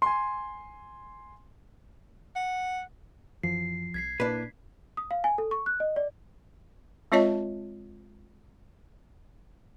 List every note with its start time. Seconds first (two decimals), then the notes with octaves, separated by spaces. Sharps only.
0.02 G#5 C6
2.36 F#5
3.43 F#2 E3 F3 C7
3.94 C2 G#6 B6 C7
4.20 A#2 A#3 D4 E4 B4
4.97 D#6
5.11 F5
5.24 G#5
5.38 A4
5.51 C#6
5.66 F#6
5.80 D#5
5.96 D5
7.12 G#3 C4 F4 C#5 D#5 A5